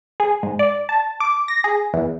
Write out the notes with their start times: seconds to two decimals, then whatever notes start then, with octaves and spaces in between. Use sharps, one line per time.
0.20 G#4
0.43 G#2
0.59 D5
0.89 A5
1.20 D6
1.48 A#6
1.64 G#4
1.93 E2